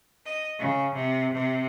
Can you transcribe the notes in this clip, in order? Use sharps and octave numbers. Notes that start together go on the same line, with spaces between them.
D#5
C#3
C3
C3